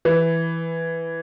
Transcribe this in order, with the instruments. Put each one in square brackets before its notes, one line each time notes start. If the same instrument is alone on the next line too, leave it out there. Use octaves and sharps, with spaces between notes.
[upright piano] E3